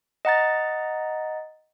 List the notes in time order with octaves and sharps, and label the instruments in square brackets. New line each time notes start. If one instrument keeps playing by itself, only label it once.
[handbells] D#5 F#5 A#5 A6